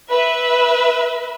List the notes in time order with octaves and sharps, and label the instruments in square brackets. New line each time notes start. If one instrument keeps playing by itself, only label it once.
[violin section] B4 E5